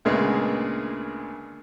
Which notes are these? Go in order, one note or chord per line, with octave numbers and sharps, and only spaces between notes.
D2 A#2 C#3 G#3 A#3 B3